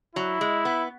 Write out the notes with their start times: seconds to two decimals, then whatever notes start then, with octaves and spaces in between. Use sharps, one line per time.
0.15 F#3 E4
0.41 G#3
0.65 B3